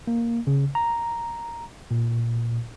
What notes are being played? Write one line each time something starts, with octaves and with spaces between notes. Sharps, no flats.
A#3
C#3
A#5
A#2